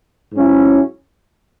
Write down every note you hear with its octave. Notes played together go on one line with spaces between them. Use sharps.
G#2 F#3 C#4 E4